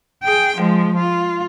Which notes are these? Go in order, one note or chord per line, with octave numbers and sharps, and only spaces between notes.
G#4 G5
F3 G#3
F4